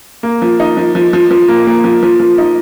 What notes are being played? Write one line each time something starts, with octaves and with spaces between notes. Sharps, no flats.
A#3
F3
D#4
F3
F3
F3
F3
A#3
A#3
F3
F3
F3
D#4